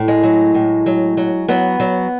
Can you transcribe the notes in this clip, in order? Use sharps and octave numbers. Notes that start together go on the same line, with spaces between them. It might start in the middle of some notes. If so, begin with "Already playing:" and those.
Already playing: A2
G#3
F#3
A2
F#3
F#3
F#3 B3
F#3